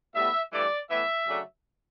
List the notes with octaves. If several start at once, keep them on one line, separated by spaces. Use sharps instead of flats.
A2 G3 B3 E5
G2 E3 A3 D5
A2 E3 B3 E5
C#3 F#3 A3 D4